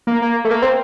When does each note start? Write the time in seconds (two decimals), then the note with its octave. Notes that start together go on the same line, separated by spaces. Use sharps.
0.07 A#3
0.22 A#3
0.45 A3
0.51 A#3
0.62 C4